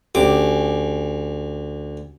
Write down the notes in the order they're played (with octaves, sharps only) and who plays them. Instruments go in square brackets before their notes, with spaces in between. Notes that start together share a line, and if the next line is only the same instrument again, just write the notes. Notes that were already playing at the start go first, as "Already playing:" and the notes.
[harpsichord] D2 D6 [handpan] C#4 G4